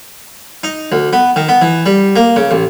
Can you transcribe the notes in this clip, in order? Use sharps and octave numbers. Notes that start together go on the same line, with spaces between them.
D#4
D2
B3
D#3
B3
E3
G3
A#3
C#3
A1